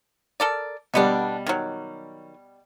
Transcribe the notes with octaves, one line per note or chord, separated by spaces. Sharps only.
A4 A#4 D5
B2 D3 G3 B3 D4
D#3 F#3